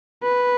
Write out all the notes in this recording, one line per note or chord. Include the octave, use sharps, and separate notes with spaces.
B4